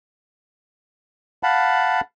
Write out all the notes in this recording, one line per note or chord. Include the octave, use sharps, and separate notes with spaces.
F5 F#5 A5 B5